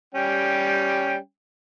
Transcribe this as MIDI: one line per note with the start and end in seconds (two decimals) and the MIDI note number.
0.15 1.16 55
0.15 1.16 61
0.15 1.16 79